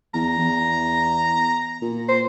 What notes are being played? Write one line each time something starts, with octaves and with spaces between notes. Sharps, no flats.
E2 A#5
E2
A#2
C5